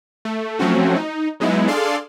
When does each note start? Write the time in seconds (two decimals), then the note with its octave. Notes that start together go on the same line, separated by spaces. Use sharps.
0.25 A3
0.59 F3 F#3 A3 C4 C#4 F#4
0.96 D#4
1.40 F#3 G#3 B3 D#4 E4
1.67 D4 G#4 A4 D5 F5 C6